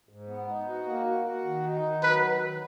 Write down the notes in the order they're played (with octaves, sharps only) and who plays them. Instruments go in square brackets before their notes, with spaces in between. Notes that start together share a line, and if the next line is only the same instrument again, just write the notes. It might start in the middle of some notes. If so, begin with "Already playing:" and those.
[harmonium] G#2
B3
D#4
F#4
A#3
F#4
F#4
D#3
D#4
D#3
[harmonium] F#3 [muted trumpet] B4
[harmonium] D#3
D#3